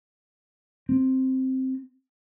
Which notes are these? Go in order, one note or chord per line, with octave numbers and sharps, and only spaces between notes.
C4